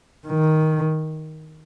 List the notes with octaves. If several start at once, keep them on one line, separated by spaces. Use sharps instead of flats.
D#3